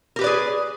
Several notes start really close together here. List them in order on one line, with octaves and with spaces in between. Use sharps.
A#4 G4 B4 D5 G#4